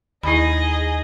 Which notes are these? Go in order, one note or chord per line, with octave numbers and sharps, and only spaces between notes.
D#2 D#4 E4 G#4 D#5 B5